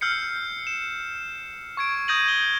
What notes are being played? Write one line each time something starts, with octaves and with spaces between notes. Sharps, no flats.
E6 F6 G6 C7 C#7
E7
C#6 G#6 D7
D#6 G6 G#6 A#6 D#7 F#7
G#6 G7